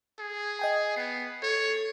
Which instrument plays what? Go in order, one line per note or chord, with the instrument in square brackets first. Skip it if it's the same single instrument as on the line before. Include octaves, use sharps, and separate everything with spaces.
[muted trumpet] G#4
[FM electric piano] D#5 G5 G#5
[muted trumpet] B3 [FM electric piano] C7
[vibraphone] A4 [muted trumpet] C#5